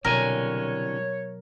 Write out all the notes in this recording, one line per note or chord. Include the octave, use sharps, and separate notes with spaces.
C2 B2 D3 F#3 A#4 C#5 G#5